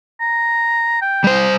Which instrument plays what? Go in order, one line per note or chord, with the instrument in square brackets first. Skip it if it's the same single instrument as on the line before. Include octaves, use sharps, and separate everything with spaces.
[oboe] A#5
G5
[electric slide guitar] G3 C5